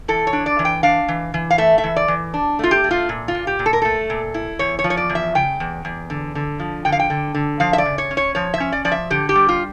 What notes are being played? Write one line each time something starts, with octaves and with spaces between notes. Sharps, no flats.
E3 A4
C#5
D4
D5
E3
G5
D4 F5
E3
E3
F5
A3 E5
E5
E3
D5
E3
D4
A3 F4
G4
A3
F4
A#2
F4
A#2
G4
A#2
A4
A#4
A3 A4
A#2
E4
E2 C#5
C#5
F3
C#5
D5
E2
E5
C#3 G5
E2
E2
D3
D3
F3
D3 G5
F5
G5
D3
D3
F3 F5
E5
D5
C#3
C#5
C#4
C#5
F3 C#5
E5
C#4
D5
F3 D5
E5
D3 G4
G4
G3
F4